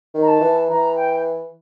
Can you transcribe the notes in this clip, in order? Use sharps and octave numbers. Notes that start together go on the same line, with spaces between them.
D#3
A#5
A5
E3
E3 A#5
G5